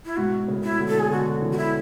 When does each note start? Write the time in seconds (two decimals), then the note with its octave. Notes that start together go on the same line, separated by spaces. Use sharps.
0.05 E4
0.17 G#2 B2 F#4
0.48 A2 C#3
0.63 E4
0.79 B2 D3
0.88 A4
0.99 G#4
1.10 B2 D3 F#4
1.42 C#3 E3
1.52 F#4
1.57 E4